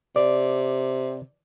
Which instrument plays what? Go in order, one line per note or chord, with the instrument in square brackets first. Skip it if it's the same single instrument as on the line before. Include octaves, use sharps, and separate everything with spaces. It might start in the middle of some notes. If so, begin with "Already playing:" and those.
[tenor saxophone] C3 [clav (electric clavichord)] D5